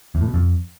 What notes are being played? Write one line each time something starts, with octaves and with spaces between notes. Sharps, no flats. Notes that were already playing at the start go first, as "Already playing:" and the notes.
E2
A2
B2
F2